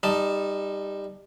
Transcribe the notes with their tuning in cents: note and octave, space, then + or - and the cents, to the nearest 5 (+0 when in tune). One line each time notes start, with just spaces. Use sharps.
G3 +20 D#4 +0 A5 +0